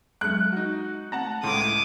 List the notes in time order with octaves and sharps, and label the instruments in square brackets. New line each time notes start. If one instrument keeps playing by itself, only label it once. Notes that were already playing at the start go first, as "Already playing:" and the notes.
[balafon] F#3 G#3 [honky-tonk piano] F#6
[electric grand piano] D#4 F#4
[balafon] A3 C4 [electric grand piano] F#5 A5 A#5
[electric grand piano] C#2 A2 [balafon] A4 C6 [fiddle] D6 D#6